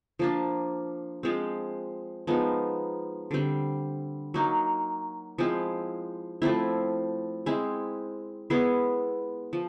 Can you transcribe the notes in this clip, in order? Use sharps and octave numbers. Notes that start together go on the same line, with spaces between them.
F3 A#3 D4
F3 G#3 C4
F3 G#3 B3 D#4
D3 G3 C4
F#3 A#3 D#4
F3 G#3 C4 E4
F3 A3 C4 E4
G#3 C4 E4
G#3 B3 E4 G#4
F3